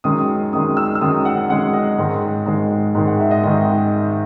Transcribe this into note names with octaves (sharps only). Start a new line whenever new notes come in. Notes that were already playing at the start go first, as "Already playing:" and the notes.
F#2 D#3 G#3 D#6
F#2 D#3 G#3 D#6
E6
E6
F#2 D#3 G#3 D#6
F#5
F#2 D#3 G#3 F#5
D#5
G#2 D#3 G#3
G#2 D#3 G#3
G#2 D#3 G#3
F#5
E5
D#5
G#2 D#3 G#3 D#5